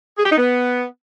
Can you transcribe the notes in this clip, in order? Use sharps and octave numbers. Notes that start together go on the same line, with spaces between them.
G#4
G4
D#4
B3